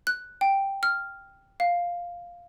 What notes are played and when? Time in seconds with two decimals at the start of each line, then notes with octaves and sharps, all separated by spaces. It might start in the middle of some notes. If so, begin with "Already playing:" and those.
0.07 F#6
0.41 G5
0.83 F6
1.60 F5